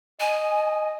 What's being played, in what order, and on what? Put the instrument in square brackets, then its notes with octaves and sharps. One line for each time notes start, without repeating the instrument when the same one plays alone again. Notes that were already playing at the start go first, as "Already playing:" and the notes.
[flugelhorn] D#5 [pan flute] G#5